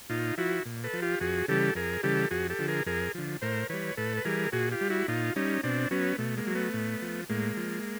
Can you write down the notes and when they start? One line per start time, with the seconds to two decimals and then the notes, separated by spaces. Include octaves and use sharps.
0.10 A#2 D#4 F4
0.38 F3 E4 F#4
0.65 A#2
0.84 A4 B4
0.93 F3
1.02 F4 G4
1.20 F2 F#4 G#4
1.48 C#3 E3 G3 G4 A4
1.75 F2 G#4 A#4
2.03 C#3 E3 G3 G4 A4
2.31 F2 F#4 G#4
2.50 G4 A4
2.59 D3 F3
2.68 G#4 A#4
2.86 F2 G#4 A#4
3.15 D3 F3
3.42 A2 A#4 C5
3.69 E3 G3 B4 C#5
3.97 A2 A4 B4
4.17 B4
4.25 E3 G3 G#4 A#4
4.52 A#2 F#4 G#4
4.71 F4 G4
4.81 G3
4.90 E4 F#4
5.08 A#2 D#4 F4
5.36 G3 C#4 D#4
5.63 B2 C4 D4
5.91 F#3 B3 C#4
6.18 B2 A3
6.37 G#3 A#3
6.47 F#3
6.55 A3 B3
6.74 A2
7.02 F3
7.29 A2 G#3 A#3
7.57 F3